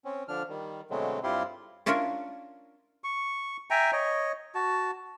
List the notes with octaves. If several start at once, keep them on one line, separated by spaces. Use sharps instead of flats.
C4 C#4
D3 F3 D4 F6
D#3 G3
B2 D3 F#3 G#3 A3 C4
G2 C4 E4 F4 G4 C6
C#4 D4 E4 F4 A#4 C#5
C#6
E5 G5 G#5 A#5
C#5 D#5
F#4 A5